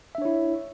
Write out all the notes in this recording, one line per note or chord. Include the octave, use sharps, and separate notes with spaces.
D4 E4 C#5 E5